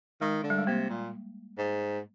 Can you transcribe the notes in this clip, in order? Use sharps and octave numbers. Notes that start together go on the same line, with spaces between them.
D#3 G#3
D3
G3
G#3
C3 A#3
A#2
G#2